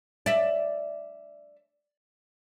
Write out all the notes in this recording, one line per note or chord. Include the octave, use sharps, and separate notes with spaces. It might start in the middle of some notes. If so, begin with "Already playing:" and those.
D5 E5